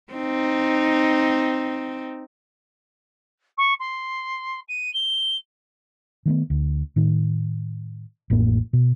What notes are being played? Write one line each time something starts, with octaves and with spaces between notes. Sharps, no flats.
C4 D#4
C#6
C6
D#7
G7
D#3 A3 B3
D2
A2 D#3
A1 F2 A2 A#3
B2